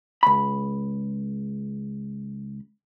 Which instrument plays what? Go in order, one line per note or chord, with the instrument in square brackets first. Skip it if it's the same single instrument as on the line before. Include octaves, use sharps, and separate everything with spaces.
[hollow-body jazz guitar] C#2 B5